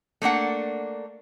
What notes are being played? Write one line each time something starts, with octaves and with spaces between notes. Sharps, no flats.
A3 A#3 D4 F#5